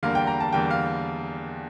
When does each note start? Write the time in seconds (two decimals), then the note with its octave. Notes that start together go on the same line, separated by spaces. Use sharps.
0.03 E2 D3 G3 A#3 F5
0.15 G5
0.27 A#5
0.40 A5
0.53 E2 D3 G3 A#3 G5
0.71 F5